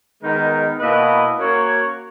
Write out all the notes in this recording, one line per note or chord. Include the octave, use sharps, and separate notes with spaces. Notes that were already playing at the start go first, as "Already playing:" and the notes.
D#3 G#3 B3 D#4 A#4
B2 A#3 E4 B4 D#5
A#3 C#4 F#4 A#4 C#5